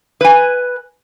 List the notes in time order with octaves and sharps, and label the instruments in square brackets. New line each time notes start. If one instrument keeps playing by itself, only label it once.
[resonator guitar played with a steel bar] B4 G#5